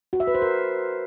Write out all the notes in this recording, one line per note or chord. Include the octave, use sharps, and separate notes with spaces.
F#4
E5
B4
C5
A#4